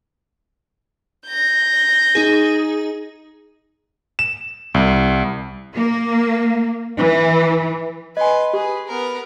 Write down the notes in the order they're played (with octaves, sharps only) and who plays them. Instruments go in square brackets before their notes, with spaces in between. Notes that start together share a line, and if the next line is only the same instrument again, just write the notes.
[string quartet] G6 A#6
[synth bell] D#4 G#4
[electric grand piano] E7
C2
[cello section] A#3
E3
[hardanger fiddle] B4 C6 [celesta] D#5 G#5
[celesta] G4 [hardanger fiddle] G#4 B4
[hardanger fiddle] B3 A#4